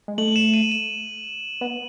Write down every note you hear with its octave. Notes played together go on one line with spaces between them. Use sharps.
G#3
A3 F#7
E7
D#7
E7
B3